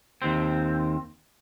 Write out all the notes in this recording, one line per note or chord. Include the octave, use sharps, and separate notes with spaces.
D#2 C4